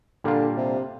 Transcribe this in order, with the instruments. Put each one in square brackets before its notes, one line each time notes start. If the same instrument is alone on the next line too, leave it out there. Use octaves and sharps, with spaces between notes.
[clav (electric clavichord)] A#2 G3 A#3 D4 F4 [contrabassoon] D3
[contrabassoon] C3